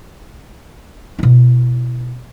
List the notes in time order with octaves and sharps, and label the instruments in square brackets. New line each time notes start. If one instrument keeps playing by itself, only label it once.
[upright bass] B2 E4